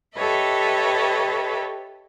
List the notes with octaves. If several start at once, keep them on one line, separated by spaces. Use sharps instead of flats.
G4 A4 B4 C#5 D#5 E5